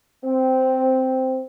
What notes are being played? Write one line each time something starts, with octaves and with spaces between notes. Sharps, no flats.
C4